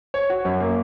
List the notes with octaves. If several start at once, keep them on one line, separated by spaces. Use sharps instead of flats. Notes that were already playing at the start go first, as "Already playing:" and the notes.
C#5
F#4
F#2
A#3